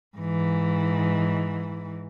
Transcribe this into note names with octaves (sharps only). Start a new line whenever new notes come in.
G#2 E3